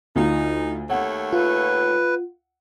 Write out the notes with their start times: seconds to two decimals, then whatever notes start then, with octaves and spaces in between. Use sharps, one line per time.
0.16 D2 D#4 F4
0.90 D#2 A3 C#5 F#5
1.33 F4 B4